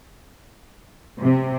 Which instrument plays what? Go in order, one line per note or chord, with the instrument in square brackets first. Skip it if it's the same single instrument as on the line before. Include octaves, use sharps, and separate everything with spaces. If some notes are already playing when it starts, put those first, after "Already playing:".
[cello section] C3